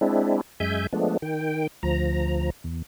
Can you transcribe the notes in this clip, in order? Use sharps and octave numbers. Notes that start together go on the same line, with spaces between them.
G#3 C4 D4 E4
F#2 G#3 E5 G#5 G6
F3 G#3 A3 B3 D4
D#3 G5
D2 F3 A#5
E2